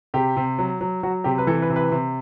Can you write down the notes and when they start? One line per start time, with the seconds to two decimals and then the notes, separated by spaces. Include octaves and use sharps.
0.14 C3 G4
0.36 C3
0.59 F#3
0.81 F#3
1.03 F#3 F#4
1.24 C3 G4
1.38 B4
1.47 E3 A4
1.62 B4
1.70 C3
1.76 B4
1.91 C3